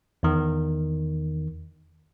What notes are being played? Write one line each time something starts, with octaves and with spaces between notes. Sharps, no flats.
E2 D#3